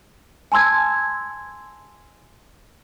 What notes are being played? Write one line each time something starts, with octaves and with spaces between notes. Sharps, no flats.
G#5 A5 C6 E6 G#6